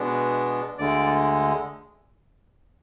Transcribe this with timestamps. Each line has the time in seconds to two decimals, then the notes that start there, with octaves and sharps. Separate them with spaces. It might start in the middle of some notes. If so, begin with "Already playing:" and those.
Already playing: B2 G#3 B3 D4
0.78 D2 D3 G#3 D5